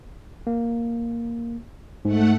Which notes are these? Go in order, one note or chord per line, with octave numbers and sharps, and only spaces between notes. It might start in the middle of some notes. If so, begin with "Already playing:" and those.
A#3
G#2 A3 F#5